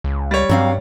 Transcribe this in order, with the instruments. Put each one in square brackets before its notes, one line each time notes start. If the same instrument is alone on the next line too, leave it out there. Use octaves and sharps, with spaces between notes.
[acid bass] C#2
[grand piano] G3 C#5
[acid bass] G2 [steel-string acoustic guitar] F#3 C4 F5